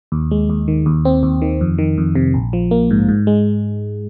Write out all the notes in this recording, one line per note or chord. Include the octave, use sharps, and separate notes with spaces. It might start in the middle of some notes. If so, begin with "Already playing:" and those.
D#2
G#3
D#2
D#3
D#2
C4
D#2
D#3
F2
D#3
F2
C3
A#1
F3
A#3
G#2
G#2
G#3